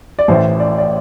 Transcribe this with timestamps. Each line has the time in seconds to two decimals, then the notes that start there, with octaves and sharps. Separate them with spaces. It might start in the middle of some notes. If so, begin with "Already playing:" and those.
0.19 D5
0.28 A1 A2 E3 C5
0.60 D5
0.78 D5